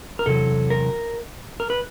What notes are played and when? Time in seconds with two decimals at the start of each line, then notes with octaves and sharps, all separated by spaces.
0.19 A#4
0.26 E2 C3 F#3 A4
0.70 A#4
1.60 A#4
1.70 B4